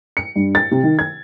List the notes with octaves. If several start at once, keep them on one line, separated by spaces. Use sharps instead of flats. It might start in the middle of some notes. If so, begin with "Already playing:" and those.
C#7
G2
A6
C3
D#3
G#6